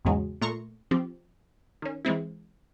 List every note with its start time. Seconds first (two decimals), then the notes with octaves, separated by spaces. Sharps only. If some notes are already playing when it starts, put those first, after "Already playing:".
0.05 B1 E2 G#2 C#3 F#3 G#3
0.42 A#2 A3 A#5 C6 C#6
0.91 F3 C4 G4
1.82 D#3 C#4
2.05 E3 G#3 C4 E4